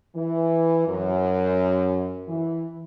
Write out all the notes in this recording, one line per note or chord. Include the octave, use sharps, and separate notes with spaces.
E3
F#2
E3